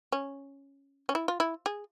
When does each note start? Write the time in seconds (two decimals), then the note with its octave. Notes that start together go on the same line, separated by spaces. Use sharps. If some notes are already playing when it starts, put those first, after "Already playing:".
0.12 C#4
1.09 C#4
1.15 E4
1.28 F4
1.40 E4
1.66 G#4